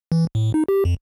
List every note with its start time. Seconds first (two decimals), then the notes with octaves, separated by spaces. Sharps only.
0.12 E3
0.35 A2
0.54 D#4
0.68 G4
0.85 F2